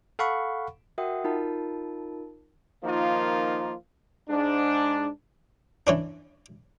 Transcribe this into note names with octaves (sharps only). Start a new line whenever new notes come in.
A4 F5 F#5 B5 C#6
F#4 A#4 E5 F#5 G5 D#6
D#4 F4 A#4 A5
D#3 F3 A#3 D#4 F4
G#2 D4
E3 C#4 D4